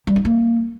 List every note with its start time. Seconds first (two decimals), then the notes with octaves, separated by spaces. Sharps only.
0.07 G3
0.16 D#4
0.25 A#3